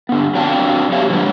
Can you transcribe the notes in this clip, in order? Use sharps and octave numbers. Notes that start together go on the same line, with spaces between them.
D3 B3
F#3 C4 D4 F5 G5 A5
G4 C#5 E5 F5
D3 F3 G#3 F#4 B4 C#5